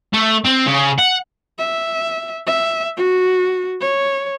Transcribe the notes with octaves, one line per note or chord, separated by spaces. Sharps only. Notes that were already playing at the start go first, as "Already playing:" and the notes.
A3
C4
C#3
F#5
E5
E5
F#4
C#5